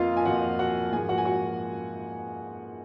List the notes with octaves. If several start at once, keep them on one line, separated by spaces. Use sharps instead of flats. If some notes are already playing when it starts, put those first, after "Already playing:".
Already playing: F2 F3 A#3 F4 D#5 F5
G#5
F2 F3 A#3 F#4 F#5
F#4 F#5
G#2 F3 A#3 G#4 G#5
F#4 F#5
G#5
F#4 F#5